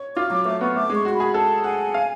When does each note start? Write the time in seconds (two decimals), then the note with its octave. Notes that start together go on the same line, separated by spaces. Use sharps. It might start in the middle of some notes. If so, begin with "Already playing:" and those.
Already playing: C#5
0.16 F4 D6
0.30 F#3 D6
0.45 A3 D6
0.61 B3 C#6
0.75 A3 D6
0.90 G#3
0.95 C#6
1.05 F#4
1.09 C#6
1.14 B5
1.20 G#4
1.34 A4 A5
1.64 F#5 G#5
1.94 F5